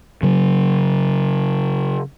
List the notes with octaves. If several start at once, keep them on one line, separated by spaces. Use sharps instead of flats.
C#3 F#3